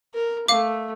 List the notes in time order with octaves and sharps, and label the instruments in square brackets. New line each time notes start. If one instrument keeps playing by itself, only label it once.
[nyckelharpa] A#4
[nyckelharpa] A3 [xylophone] F5 D6